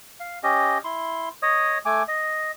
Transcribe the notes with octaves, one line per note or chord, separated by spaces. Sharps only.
F5
C#4 G4 D#5
E4 C6
C#5 D#5 D#6
A3 G#5 D6
D#5